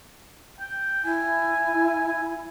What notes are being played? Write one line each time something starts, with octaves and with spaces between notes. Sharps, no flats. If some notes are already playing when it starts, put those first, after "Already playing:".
G5
E4 G#5